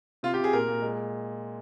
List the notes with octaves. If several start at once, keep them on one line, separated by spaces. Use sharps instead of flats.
C3 F4
G4
C3
G#4
A#2 A#4
A#2
G#3